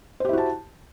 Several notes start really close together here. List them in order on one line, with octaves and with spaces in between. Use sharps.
C5 G4 E4 F#4 A5